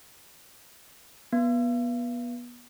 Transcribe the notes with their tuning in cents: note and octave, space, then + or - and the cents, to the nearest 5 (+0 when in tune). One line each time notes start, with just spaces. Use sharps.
B3 -25